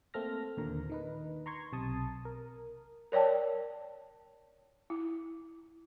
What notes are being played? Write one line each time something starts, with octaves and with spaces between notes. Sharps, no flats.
A3 A#3 C4 A4 F6 A#6
D#2 A#2 D3 A#4
D#3 D#4 B4
A#5 C6 C#6 G#6
B1 C3 A5 D#6
A#4
A#4 C#5 D5 G5 A5
E4